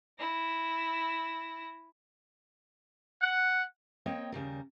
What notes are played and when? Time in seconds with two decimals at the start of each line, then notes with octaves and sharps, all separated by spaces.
0.18 E4 A#6
3.21 F#5
4.06 A#3 C4 C#5 D#5 G5
4.32 D#2 C#3 G3 A#4